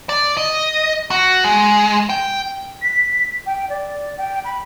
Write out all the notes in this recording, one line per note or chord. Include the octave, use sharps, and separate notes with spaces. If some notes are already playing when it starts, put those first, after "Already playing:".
D5
D#5
F#4
G#3
G5
B6
G5
D5
G5
B5